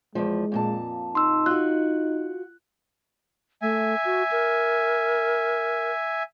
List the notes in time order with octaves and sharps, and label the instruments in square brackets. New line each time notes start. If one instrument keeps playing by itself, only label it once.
[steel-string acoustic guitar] E2 F3 [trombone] G#3
[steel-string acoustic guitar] F2 A#2 A5
[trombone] D#4 [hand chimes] C6 E6
[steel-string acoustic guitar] F4 F#4 [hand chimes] F#6
[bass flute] A3 [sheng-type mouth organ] E5 G#5
[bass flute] F#4
A#4